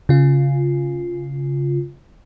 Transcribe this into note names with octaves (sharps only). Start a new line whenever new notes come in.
C#3 F4